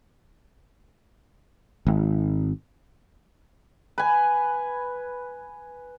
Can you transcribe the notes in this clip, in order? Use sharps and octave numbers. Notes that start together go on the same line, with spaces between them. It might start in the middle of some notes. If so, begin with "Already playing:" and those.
G#1
B4 G#5